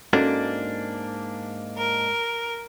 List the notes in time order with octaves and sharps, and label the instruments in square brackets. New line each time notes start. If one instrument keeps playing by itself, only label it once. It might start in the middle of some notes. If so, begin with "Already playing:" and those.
[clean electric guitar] G#2 A#3 D4 [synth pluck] C#4 F#4 A4
[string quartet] A#4